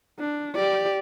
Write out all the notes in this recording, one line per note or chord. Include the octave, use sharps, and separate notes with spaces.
D4
G4 D5